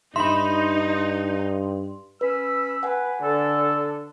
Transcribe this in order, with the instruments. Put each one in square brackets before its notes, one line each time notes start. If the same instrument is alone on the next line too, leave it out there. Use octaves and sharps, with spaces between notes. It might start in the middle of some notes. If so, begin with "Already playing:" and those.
[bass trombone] G2 [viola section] D#4 [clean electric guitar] E5 B5 [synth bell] C6
[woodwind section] C#4 B5 E6 [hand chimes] B4
[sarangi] B4 [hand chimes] F#5 G#5
[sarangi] D3 [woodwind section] A4